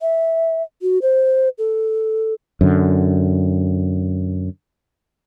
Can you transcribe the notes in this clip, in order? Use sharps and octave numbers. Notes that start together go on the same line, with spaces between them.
E5
F#4
C5
A4
F#2 D3